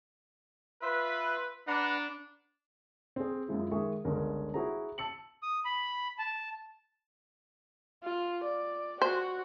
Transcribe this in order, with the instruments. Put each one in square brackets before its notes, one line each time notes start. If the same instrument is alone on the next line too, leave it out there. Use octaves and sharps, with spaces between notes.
[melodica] F4 E5 [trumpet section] B4
[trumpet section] D4 [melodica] B4 F#5 A#5
[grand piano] C4 G#4
F#2 F3 G#3 E4
D#3 G#3 G#4 E5 C#6
G1 C#2 G#3 C#4 A#4
E4 F#4 G#4 C5 A#5
A5 E6 C#7 F#7
[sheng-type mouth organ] D#6
B5
A5
[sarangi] F4
D5
[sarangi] F#4 [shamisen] C5